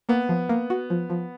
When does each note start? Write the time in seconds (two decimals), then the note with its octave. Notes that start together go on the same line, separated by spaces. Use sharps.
0.09 A#3 B3
0.29 F3
0.49 A#3
0.70 F#4
0.90 F3
1.10 F3